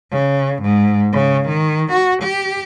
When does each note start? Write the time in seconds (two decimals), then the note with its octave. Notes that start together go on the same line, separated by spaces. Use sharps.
0.11 C#3
0.63 G#2
1.12 C#3
1.48 D#3
1.92 F#4
2.23 G4